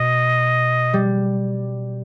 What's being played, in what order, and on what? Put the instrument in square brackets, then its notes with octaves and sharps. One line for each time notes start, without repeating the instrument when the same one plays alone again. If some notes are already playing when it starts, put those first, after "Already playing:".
Already playing: [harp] B2 [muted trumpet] D#5
[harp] G3